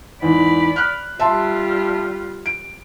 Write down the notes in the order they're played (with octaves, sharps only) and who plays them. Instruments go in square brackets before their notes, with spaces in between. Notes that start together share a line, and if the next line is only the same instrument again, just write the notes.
[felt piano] E2 G#2 [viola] D5 B5
[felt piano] F6 F#6
[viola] G3 F4 [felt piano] E5 A5 C6
[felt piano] D7